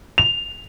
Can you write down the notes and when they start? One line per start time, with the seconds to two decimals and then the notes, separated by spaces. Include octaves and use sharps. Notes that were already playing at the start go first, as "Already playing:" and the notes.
0.18 F7